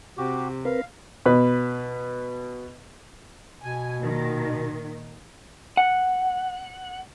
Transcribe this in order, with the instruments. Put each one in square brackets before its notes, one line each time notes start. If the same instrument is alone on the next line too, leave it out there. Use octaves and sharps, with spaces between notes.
[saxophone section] C3 [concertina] F#4 G4
[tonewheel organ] C4 A#4 B4 [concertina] F5
[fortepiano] B2 B4
[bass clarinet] B2 [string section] G#5
[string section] A#2 D#3
[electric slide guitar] F#5